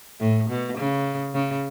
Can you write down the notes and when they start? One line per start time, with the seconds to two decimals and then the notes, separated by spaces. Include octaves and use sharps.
0.20 A2
0.50 B2
0.78 C#3
1.34 C#3